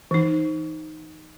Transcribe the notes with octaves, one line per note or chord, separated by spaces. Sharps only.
E3 D#4